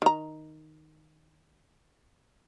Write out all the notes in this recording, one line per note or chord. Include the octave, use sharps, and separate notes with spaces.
D#3 A#5